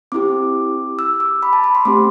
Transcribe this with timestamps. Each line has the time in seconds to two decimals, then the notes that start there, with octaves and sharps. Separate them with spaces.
0.12 C4 E4 G4 D6
0.99 E6
1.20 D6
1.43 B5
1.53 A5
1.64 B5
1.75 C6
1.85 A3 C4 G4 D6